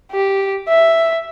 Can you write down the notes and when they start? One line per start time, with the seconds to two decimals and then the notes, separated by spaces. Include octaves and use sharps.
0.12 G4
0.68 E5